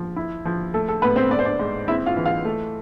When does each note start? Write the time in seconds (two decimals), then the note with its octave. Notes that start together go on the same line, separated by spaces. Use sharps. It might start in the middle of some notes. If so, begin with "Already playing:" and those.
Already playing: F3
0.16 E4
0.45 F3
0.74 A3 A4
0.88 A4
1.02 A2 B3 B4
1.16 C4 C5
1.31 B3 D5
1.39 C5
1.45 D4 D5
1.59 G#2
1.88 C4 E4 E5
2.06 F4 F5
2.17 E3
2.26 F4 F5
2.45 A3